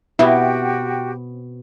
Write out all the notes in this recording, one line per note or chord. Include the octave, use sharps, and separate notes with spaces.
B2 B3 C4 E4 F#4 G4 E5 G5